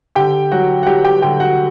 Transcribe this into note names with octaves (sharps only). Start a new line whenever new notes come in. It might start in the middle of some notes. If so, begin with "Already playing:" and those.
D3 G4 G5
F#3 F#4 F#5
F#5
F#3 G4 G5
G4 G5
D3 G4 G5
F#4 F#5